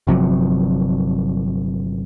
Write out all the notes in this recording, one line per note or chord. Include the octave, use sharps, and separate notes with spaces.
G1 C3 F3 F#3